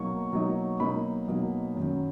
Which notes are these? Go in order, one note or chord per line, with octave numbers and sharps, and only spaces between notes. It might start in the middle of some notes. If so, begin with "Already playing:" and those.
Already playing: B2 F#3 A#3 D#4 C#6
B2 F#3 A#3 D#4
B2 F#3 A#3 D#4 B5
B2 F#3 A#3 D#4
F#2 D#3 F#3